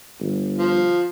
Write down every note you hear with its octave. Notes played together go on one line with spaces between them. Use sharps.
G1
F3